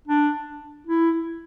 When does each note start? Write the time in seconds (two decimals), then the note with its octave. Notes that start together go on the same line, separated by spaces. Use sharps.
0.08 D4
0.87 E4